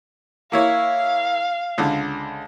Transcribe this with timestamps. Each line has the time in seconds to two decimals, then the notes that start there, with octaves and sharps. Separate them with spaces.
0.52 A#3 E4 C#5 F5
1.78 C#2 D3